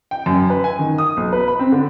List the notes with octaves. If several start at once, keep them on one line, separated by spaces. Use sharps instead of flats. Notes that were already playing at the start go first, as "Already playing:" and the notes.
G5
F#2
B4
G#5
D#3
D#6
B1
B4
B5
C4
D3